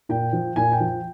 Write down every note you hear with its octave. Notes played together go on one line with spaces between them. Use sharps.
A#2 G5
F3
A#2 G#5
G5
F3
G5